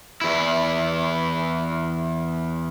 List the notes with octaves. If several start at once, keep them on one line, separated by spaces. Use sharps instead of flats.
E2 E4